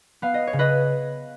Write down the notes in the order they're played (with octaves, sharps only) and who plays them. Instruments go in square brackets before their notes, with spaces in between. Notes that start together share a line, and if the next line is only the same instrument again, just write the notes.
[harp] B3 F5
D#5
C#5
C#3
B4 D#5